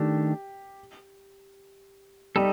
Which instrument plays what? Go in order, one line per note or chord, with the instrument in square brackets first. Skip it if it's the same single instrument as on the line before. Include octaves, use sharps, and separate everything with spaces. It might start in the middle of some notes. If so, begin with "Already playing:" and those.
Already playing: [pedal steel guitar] D#3 A3 D4 [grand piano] G4
[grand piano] G3 G4 [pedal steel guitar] D#4 A4